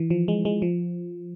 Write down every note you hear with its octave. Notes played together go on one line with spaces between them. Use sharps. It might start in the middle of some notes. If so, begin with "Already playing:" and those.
Already playing: E3
F3
G#3
G#3
F3